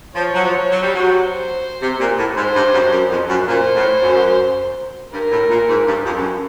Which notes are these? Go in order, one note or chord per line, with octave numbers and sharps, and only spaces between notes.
F3 C#5
F#3
F3
F#3
G3
F#3
C5
C3
A#2
A2
G#2 C5
G2
F#2
F#2
F2
F#2
A#2 C5
A2
F#2
G2 A#4
A2
A#2
G#2
G2
F2
F#2